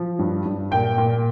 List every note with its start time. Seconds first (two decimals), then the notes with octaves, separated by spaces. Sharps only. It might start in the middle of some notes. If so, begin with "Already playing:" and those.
Already playing: F3
0.19 G2
0.46 G2
0.71 A#2 G5
0.98 A#2